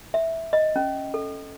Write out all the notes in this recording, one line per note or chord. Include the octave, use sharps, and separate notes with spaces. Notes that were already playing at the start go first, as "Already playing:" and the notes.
E5
D#5
C#4
A4